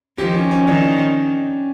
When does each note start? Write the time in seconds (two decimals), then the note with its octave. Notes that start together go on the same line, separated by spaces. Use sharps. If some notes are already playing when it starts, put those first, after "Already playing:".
0.18 D#3 F3 G4
0.34 C#4
0.51 C#4
0.67 D#3 D4